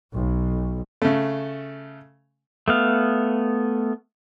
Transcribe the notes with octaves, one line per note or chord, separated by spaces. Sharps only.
B1
C#3 A3
A3 B3 F5